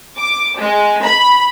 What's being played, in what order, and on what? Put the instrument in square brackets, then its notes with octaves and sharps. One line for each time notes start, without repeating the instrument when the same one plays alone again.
[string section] D6
G#3
B5